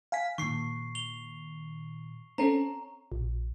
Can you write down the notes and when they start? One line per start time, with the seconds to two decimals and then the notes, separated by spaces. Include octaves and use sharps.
0.12 F5 G#5 B6
0.38 A#2 D#3 C#6 C7
0.95 F7 G7
2.38 C4 C#4 A4 A#5
3.12 A#1